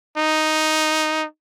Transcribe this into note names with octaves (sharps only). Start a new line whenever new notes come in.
D#4